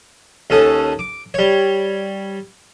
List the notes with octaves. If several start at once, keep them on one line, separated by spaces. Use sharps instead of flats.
D#2 C#4 A4 D#6
D6
G3 C#5